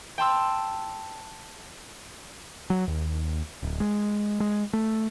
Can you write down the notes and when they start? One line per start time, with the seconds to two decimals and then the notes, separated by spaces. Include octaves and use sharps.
0.18 G5 A5 C6 E6
2.70 F#3
2.88 D#2
3.63 D1
3.80 G#3
4.40 G#3
4.73 A3